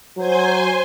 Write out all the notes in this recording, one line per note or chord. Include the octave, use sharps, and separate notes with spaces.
F#3 C5 G#5 C6